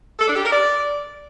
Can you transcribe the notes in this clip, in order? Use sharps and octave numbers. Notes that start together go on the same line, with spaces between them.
A4
D4
G4
A#4
D5